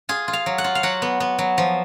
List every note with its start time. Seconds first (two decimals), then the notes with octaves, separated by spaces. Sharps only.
0.09 F4 G#4
0.28 F4
0.33 F5
0.46 F#3
0.58 F#5
0.64 F4
0.75 F5
0.83 F#3 F#5
1.02 B3
1.20 B3
1.38 F#3
1.58 F3